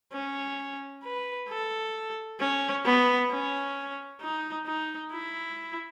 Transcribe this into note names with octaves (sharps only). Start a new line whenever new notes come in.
C#4
B4
A4
C#4
B3
C#4
D#4
D#4
E4